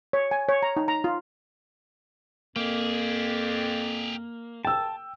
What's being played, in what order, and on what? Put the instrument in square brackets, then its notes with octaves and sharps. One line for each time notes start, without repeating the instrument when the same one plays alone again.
[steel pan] C#5
G#5
C#5
A#5
D#4
A#5
F4
[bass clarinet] F2 [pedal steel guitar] A#3 [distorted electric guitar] G4 G#4
[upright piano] G5 E6 [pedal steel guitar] A5